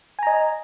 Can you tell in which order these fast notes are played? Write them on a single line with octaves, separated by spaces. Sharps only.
G#5 A#5 D#5